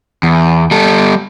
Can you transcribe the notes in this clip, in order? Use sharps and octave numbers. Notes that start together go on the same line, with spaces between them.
E2
G3 A4